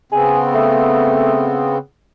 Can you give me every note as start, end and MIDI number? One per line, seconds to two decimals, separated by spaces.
0.12 1.78 49
0.12 1.78 59
0.12 1.78 60
0.12 0.39 68
0.55 1.55 57